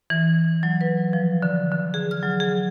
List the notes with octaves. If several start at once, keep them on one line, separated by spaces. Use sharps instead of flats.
E3
F#3
B4
F3
D3
D3
G#4
F6
F#3
G#4